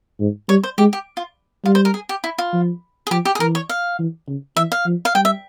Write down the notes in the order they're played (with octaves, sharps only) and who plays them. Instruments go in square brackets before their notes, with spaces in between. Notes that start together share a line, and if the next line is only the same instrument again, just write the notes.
[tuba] G#2
[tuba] G3 [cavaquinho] C#5
[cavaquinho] C5
[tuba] G#3 [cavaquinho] G4
[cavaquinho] G4
F4
[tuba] G3 [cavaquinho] F4
[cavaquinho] C5
A#4
G#4
G4
E4
F4
[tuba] F3
[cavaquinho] G#4
[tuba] F3 [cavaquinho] G4
[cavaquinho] G4
G#4
[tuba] E3 [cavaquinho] A#4
[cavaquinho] C#5
F5
[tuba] E3
C#3
[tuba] E3 [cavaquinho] E5
[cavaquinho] F5
[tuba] F3
[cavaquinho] F5
[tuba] G3 [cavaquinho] G5
[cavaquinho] E5